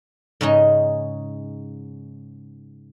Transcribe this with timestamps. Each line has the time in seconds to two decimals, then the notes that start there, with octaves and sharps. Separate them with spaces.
0.41 G#2 C#3 C#4 D#4